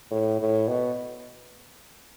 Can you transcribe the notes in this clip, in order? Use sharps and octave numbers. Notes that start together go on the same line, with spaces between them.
A2
A2
B2